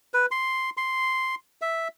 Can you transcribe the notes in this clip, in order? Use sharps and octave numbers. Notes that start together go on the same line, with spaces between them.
B4
C6
C6
E5